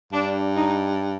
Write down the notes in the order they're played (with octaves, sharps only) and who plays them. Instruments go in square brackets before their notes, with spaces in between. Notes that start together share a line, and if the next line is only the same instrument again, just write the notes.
[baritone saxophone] G2 [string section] D4
[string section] D#4